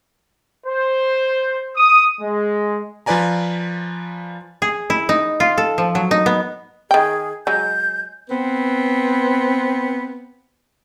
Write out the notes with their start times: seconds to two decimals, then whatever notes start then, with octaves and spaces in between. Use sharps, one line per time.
0.66 C5
1.76 D#6
2.21 G#3
3.06 F3 F4 B4 D5 G#5 A#5
4.62 G#4
4.90 E4
5.09 D#4
5.40 F4
5.58 A4
5.78 F3
5.95 F#3
6.11 D#4
6.26 B3
6.91 D#3 G#4 G5
7.47 F#3 G#3 G6
8.30 B3 C4 B4